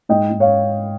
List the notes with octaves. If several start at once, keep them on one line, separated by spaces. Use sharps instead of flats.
G#2 D#5 G5
G#2
C#5 F5